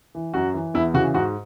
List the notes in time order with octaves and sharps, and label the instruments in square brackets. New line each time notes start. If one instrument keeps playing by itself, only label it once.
[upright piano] E3
F#2 F#4
E3
E2 E4
C#3 F#4
E3
G#2 F#4